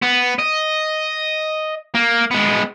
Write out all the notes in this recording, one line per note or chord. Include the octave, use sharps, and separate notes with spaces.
B3
D#5
A#3
G#3 B3